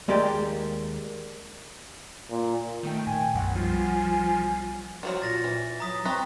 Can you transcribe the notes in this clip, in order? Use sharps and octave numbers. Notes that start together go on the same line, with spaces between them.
D#2 G#3 A#3 G4 D5 G5
A#2
D#3 A3 G5
A#2 G#5
B1 F#2 F#3 F#5
F3 G3
D#3 F3 F#3 F#4
A#2 A6 A#6
E3
F#3 A#5 D#6 B6
C4 B4 A#5 C#6